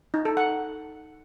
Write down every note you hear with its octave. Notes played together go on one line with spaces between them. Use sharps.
D#4
A4
F#5